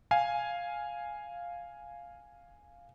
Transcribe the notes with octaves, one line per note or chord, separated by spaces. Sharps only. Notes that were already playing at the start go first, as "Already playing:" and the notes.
F5 G#5